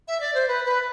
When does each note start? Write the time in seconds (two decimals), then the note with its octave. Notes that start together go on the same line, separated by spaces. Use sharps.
0.08 E5
0.20 D5
0.35 C5
0.48 B4
0.66 B4